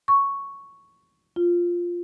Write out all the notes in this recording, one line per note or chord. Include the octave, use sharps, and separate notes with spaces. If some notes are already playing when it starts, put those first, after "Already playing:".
C#6
F4